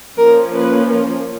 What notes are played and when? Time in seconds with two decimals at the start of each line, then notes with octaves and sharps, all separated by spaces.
0.17 F3 A#3 C#4 A#4
0.55 B4